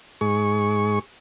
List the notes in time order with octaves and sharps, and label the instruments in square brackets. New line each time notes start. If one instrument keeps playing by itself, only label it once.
[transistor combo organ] G#2 G#4 C#6